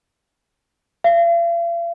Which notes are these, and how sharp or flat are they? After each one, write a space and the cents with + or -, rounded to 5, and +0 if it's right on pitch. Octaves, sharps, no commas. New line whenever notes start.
F5 -45